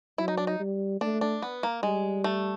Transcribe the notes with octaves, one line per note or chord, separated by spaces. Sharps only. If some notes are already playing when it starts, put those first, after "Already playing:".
F#3 E4
D#4
D4
D#4
G3
A3 D4
D4
B3
A#3
G3 G#3
A3